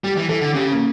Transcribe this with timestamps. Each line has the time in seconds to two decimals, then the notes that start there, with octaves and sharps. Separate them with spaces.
0.04 G3 G4
0.17 E3
0.29 E3 A4
0.41 D3
0.53 C#3 G4
0.71 A#3